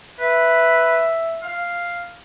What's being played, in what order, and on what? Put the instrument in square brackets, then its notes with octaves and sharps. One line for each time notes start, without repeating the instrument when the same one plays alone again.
[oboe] B4 [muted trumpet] E5
[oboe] F5